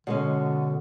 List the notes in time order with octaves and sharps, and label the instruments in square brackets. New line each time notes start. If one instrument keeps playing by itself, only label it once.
[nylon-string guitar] B2 G#3 C#4 [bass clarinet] D3